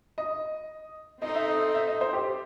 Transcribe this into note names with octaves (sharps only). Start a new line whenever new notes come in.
D#5
C4 D#4 A4 D#5
E5
D#5
E5
D#5
C5
G4